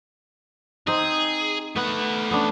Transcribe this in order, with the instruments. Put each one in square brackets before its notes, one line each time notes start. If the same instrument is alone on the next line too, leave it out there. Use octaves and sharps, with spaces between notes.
[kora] C4 D#4 [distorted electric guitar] G#4
[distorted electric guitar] A3 F#5 [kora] B3
[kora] B3 C#4 D4